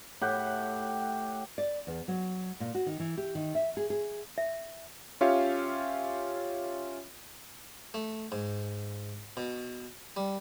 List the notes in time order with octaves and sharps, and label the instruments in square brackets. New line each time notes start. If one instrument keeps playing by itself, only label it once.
[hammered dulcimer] A2 G4 F#5 G5
[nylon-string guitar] D5
E2
F#3
A#2
F#4
D#3
E3
G4
D#3
E5
G#4
G#4
[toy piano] E5
[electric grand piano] C#4 F4 G4 C#5 E5 F5
[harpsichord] A3
G#2
B2
G3